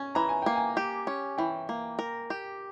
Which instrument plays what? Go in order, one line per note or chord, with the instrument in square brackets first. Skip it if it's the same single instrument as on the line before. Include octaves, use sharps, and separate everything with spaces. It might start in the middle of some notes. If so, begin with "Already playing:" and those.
Already playing: [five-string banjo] C#4 [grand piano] G#5
[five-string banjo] E3 [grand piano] A#5
[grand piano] G#5
[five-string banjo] A#3 [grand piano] G5
[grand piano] G#5
[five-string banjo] G4
C#4
[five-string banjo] E3 [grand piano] G5
[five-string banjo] A#3
A#4
G4